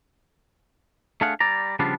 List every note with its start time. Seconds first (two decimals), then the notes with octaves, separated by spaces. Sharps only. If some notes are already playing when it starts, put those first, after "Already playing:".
1.21 A3 D4 G#4 F5 F#5
1.40 G3 D5 A#5
1.79 C#3 F3 G3 B3 D4 F4